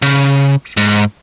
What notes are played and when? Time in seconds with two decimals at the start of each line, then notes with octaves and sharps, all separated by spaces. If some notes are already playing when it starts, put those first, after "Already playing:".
0.02 C#3
0.77 G#2